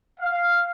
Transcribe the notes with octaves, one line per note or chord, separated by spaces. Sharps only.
F5